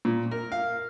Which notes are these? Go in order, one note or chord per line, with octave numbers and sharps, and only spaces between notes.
A#2
A#4
F5